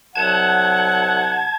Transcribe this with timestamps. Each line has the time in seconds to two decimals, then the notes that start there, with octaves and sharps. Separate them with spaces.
0.16 C2 F#3 F#5 A5 G#6